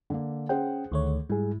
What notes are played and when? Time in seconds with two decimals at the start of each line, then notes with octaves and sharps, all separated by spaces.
0.10 D3 A#3
0.49 C#4 G#4 C5 F#5 G5
0.92 D2 D#3 A3 C#5
1.30 G#2 G3 E4 G#4